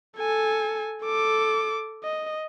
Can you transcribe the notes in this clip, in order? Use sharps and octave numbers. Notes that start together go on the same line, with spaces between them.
A4 G#5
A4 D6
D#5